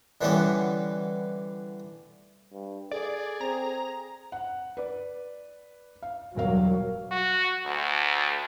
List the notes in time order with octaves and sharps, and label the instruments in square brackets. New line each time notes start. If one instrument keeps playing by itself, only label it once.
[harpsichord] D3 E3 G3 B3 C#4
[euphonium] G2
[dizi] G#4 [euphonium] A4 [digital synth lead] D5
[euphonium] C4 [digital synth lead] A#5
[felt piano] F#5
B4 D5
F5
[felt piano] E1 A#4 F5 [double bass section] G2 F#3
[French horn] F#4
D2